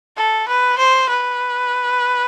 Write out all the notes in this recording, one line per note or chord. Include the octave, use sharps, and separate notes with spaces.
A4
B4
C5
B4